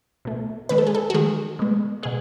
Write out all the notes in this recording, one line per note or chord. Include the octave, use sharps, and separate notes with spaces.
B2 A3
D#3 G#3 B4
A4
G#4
A4
F#4
D#3 G#3 G#4
B2 G#3
B2 G#3 G#4